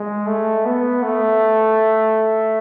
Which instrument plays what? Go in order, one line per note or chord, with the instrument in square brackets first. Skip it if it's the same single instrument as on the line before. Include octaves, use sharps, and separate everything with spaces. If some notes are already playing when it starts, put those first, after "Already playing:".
Already playing: [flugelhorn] G#3
A3
B3
A3